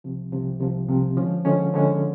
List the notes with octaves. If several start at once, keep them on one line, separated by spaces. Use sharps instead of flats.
C2 C3 F3
C2 C3 F3
C2 C3 F3
C2 C3 F3
D3 F3 G#3 C#4
D3 F3 G#3 C#4
D3 F3 G#3 C#4